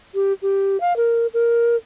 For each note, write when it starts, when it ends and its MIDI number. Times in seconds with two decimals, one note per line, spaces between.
0.14 0.32 67
0.42 0.79 67
0.80 0.96 77
0.96 1.26 70
1.33 1.75 70